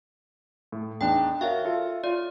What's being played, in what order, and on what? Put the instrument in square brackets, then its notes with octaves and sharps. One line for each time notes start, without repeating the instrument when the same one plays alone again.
[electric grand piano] A2
[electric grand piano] E2 D4 D#4 [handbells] G5
[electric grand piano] F#4 A#4 C#5 [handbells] E5 F5
[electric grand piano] F4 A4
[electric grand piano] F4 C#5 [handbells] D5